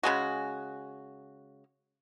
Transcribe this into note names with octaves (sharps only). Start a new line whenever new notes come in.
C#3 G#3 F#4